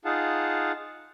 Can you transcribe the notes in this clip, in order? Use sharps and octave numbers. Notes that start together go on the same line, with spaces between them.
D#4 F4 G#4 F5 F#5 A5